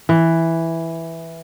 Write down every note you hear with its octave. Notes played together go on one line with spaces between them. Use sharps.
E3